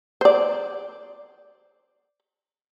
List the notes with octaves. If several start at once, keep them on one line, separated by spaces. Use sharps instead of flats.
C5 D5